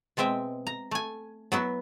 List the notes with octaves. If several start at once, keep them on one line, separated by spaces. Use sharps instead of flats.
B2 G#3 C4 E5 G5
A#5
A3 G#5
F#3 B3 E4 F#4